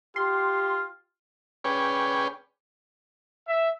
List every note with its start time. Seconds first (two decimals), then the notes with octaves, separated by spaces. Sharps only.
0.16 F4 G4 C6
1.64 C#4 G#4 B4 C#5 D5 G5
3.47 E5